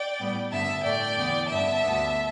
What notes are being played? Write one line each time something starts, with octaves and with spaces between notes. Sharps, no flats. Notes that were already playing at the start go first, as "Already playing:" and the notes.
Already playing: D5 G5
A2 G3 B3
G2 D3 B3 E5 A5
A2 A3 D5 G5
E2 D3 B3
G2 D3 B3 E5 A5
D2 D3 B3